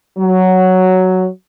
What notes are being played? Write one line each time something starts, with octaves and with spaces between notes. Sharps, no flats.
F#3